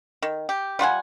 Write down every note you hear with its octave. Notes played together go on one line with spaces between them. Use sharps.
D#3
G4
G3 F4 F#5 G#5